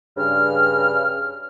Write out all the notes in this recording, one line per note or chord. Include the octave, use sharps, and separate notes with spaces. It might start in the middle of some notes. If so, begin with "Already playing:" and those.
G2 C#3 F6